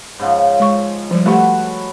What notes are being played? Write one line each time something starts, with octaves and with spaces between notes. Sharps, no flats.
G#2 C#3 F3
G#3 C#6
F3 G3
A3 F#4 G4 A4 B4